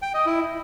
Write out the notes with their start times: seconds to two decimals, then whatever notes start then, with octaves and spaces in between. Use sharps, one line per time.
0.02 G5
0.14 D#5
0.26 E4